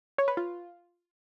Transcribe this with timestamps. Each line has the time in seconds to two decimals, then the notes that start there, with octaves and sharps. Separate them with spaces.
0.18 C#5
0.28 B4
0.37 F4